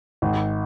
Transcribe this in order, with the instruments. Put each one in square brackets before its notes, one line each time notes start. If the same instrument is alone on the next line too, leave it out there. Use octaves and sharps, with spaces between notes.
[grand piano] G#1